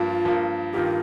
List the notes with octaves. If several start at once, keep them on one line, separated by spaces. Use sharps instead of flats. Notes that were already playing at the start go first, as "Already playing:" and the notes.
Already playing: G2 F3 A#3 F4
G2 F3 A#3
G2 D#3 A#3 F4 G4